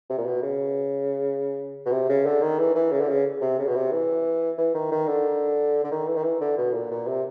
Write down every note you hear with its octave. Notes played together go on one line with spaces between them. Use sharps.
C3
A#2
B2
C#3
B2
C3
C#3
D3
D#3
E3
E3
C#3
D3
C#3
C3
C#3
B2
C3
E3
E3
D#3
D#3
D3
D3
D#3
E3
D#3
E3
D3
B2
A#2
A#2
C3